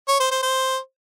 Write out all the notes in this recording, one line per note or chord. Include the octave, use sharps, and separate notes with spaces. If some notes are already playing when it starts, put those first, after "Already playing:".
C#5
C5
C5
C5